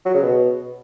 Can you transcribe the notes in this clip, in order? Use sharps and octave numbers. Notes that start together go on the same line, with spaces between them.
F#3
C#3
B2